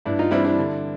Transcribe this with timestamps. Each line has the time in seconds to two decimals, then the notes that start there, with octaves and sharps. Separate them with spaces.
0.05 G2 D4 E4
0.19 D#4 F4
0.31 E3 G3 C4 D4 E4
0.44 D4 E4
0.58 D3